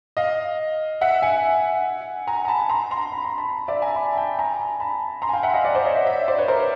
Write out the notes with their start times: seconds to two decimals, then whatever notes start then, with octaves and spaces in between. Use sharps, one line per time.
0.17 D#5 F5
1.01 E5 F#5
1.22 F#5 G#5
2.27 G#5 A#5
2.45 A#5
2.48 A5 B5
2.70 A#5 C6
2.91 A#5 C6
3.12 B5
3.25 A#5
3.38 A5 B5
3.68 D5 E5
3.82 G#5 A#5
3.96 A5 B5
4.17 G5 A5
4.39 G#5 A#5
4.80 A5 B5
5.22 A#5 C6
5.29 G#5
5.33 F5 G5
5.43 E5 F#5
5.54 D#5 F5
5.65 D5 E5
5.75 C5 D5
5.85 C#5 D#5
5.96 D5 E5
6.07 D5 E5
6.28 C5 D5
6.38 B4 C#5
6.48 A#4 C5